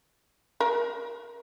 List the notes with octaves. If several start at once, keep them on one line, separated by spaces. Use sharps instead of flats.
A#4